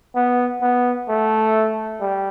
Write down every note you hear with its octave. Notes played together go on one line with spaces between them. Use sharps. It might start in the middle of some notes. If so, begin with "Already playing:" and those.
B3
B3
A3
G3